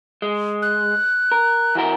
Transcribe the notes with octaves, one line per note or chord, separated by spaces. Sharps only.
G#3
F#6
A#4
E3 F#4 A#4